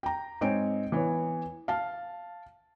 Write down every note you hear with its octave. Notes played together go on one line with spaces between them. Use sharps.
G5 A#5
G#2 C4 D#4 C#5 G#5 D7
E3 B3 C#5
F5 A5